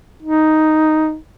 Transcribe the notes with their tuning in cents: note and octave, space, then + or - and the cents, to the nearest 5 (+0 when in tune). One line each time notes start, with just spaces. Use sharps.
D#4 +0